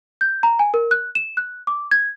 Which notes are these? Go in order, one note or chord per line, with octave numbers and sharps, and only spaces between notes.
G6
A#5
G#5
A#4
F#6
E7
F#6
D6
G#6